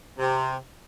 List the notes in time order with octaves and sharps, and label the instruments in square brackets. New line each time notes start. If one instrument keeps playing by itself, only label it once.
[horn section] C3